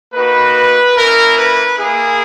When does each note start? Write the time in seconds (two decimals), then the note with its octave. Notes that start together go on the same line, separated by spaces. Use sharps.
0.13 A#3 D#4 F#4 B4
0.96 A#3 C#4 E4 A#4
1.37 B4
1.78 A#3 E4 G#4